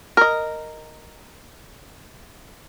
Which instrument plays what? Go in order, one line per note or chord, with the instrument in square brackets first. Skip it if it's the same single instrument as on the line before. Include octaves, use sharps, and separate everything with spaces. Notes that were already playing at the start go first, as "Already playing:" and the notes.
[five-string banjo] A#4 D#5